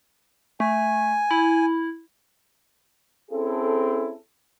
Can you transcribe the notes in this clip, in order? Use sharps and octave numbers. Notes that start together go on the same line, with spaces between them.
A3 G#5
E4
C4 C#4 E4 G#4 A4